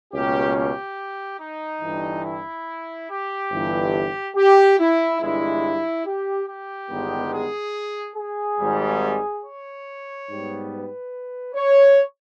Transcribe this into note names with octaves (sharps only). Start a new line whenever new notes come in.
C#2 B2 A#3 C#4 G4
G4
D#4
G1 G2 E3
E4
G4
G1 G2 E3
G4
E4
G1 G2 E3 G#3 E4
G4
G4
G1 G2 D#3 G#3 B3
G#4
G#4
G#1 G#2 G3
C#5
G#2 G3 B3
B4
C#5